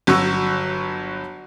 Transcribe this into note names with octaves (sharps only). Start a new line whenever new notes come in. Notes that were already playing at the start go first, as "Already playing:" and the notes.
G1 F#3 F#4 C#6 E6